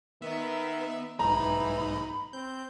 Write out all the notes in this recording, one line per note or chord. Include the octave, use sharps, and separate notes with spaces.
D#3 B3 E5
B1 G#2 E3 D#4 A#5 B5
C4 G6